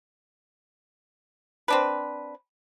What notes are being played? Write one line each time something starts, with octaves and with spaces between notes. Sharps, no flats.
C4 D4 B4